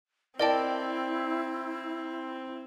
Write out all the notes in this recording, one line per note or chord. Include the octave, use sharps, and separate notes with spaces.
C4 E4 A#4 D5 D#5 G5 A5